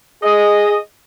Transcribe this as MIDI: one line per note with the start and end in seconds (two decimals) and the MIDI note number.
0.23 0.78 68
0.23 0.76 75